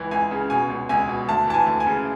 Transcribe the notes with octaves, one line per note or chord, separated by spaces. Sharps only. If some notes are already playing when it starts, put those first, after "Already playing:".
Already playing: C#2 E3
C#2 G#5
C#3
B2 G#5
C#2
C#2 G#5
B2
D2 A5
E3 A5
G#5
D2
G#5
C#3